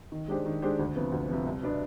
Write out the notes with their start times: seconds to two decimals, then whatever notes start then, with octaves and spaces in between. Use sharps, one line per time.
0.12 D#3
0.28 G#3 D4 G4 C5
0.46 D#3
0.62 G#3 D4 G4 C5
0.79 D2
0.96 C3 F3 B3
1.12 D2
1.29 C3 F3 B3
1.46 C2
1.62 B2 B3 D4